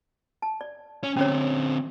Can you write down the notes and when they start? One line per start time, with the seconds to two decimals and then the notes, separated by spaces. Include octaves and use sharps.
0.42 A5
0.61 D5
1.03 C#4
1.17 D3 C4 C#4 C#5